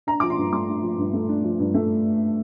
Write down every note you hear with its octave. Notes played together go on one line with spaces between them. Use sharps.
D4 A#5
F3 D6
C6
G2
A3 D6
D4
F3
G2
A3
D4
F3
G2
A3